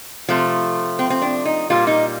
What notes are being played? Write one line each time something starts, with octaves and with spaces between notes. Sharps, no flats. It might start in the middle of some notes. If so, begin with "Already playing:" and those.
C3 F3 A3
C4
C4
D4
D#4
A#2 G3 A#3 F4
D#4